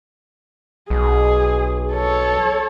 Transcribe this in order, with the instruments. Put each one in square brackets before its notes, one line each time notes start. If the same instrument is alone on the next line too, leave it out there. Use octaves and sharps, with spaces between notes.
[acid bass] B1 [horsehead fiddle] G#4
[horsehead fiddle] A4 C#5